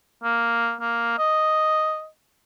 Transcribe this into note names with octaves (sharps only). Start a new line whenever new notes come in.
A#3
A#3
D#5